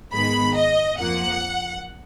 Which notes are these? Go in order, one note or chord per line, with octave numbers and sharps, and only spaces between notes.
G#2 D#3 G#3 B3 B5
D#5
F2 F3 A#3 F#5